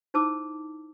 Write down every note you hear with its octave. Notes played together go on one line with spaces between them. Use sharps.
D#4 E4 C5 A5 D6 E6